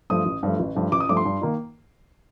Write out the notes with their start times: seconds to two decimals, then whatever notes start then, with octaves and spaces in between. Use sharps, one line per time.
0.10 G2 F3 A3 D#6
0.26 A1
0.43 G2 F3 A3
0.60 A1
0.75 G2 F3 A3
0.92 A1 D6
1.00 D#6
1.09 G2 F3 A3 D6
1.17 C6
1.25 G2
1.41 D#3 A#3 D#4